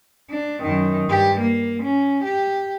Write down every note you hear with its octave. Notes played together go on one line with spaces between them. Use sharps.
D4
F#2 D#3
G2 G4
A#3
C#4
G4